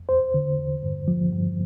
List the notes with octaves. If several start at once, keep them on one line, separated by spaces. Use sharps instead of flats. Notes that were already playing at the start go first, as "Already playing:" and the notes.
Already playing: F2
E2 C5
D3
E2
G2
F3
G2